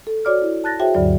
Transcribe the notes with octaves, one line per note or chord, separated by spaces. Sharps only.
A4
F#4 C#5 D5 D6 F6
E4
A5 F#6 A6 A#6
F#4 G#4 C5 C#5 E5 G5
D2 G2 D3 F#3 D5